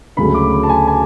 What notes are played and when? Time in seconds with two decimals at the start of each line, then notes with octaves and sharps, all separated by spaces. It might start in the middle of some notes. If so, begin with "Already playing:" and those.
0.17 D2 C#3 F#3 A3 B5
0.34 D6
0.63 A5
0.69 G#5
0.88 G#5